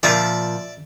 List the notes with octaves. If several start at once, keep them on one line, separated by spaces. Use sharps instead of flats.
A#2 F3 D5 E5